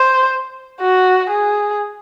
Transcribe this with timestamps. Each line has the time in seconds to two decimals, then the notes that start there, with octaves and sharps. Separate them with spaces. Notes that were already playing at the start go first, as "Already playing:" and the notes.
Already playing: C5
0.81 F#4
1.30 G#4